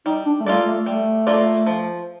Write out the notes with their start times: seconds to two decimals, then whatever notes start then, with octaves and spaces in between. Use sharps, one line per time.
0.06 G3 D#4
0.26 D4
0.40 A3
0.46 G3 A#3 F4 A4 D5
0.66 A3
0.86 G3 A3
1.27 A#3 F4 A4 D5
1.67 F3